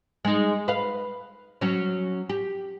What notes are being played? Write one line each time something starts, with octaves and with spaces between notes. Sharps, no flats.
G#3 D#4
B4 F5
F#3 C#4
G4